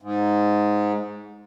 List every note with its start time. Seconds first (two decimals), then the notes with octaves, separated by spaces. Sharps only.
0.02 G#2